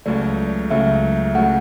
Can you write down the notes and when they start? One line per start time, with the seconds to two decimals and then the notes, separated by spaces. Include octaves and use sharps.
0.06 C#2 C#3 F#3 A3 D5
0.70 C#2 C#3 F#3 A3 E5
1.35 C#3 F#3 A3 F#5